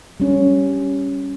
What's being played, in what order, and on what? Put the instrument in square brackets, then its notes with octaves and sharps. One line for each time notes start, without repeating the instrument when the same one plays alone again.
[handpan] G3 C#4